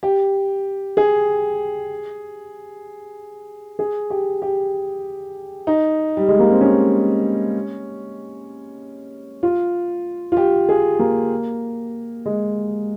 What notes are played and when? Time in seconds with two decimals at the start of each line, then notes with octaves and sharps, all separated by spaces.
0.03 G4
0.97 G#4
3.79 G#4
4.10 G4
4.42 G4
5.67 D#4
6.17 G3
6.28 G#3
6.39 A#3
6.50 C4
6.61 C#4
9.43 F4
10.32 F4
10.37 G4
10.69 G#4
10.99 A#3
12.26 G#3